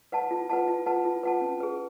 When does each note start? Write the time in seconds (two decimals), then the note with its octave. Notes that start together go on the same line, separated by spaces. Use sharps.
0.12 B4 F#5 A5
0.31 F4
0.49 B4 F#5 A5
0.68 F4
0.86 B4 F#5 A5
1.05 F4
1.23 B4 F#5 A5
1.41 C#4
1.60 G#4 B4